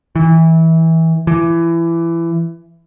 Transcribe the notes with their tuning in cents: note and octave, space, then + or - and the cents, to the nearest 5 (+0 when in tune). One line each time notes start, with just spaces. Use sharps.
E3 -20
E3 +25